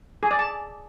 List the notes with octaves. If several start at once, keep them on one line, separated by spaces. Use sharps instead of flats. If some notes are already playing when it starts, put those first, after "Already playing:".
G#4
D5
A5